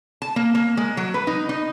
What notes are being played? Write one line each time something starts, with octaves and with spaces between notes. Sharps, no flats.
A5
A#3
A#3
G#3
F#3
B4
D#4
D#4